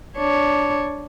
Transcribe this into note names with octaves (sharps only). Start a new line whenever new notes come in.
D4 C#5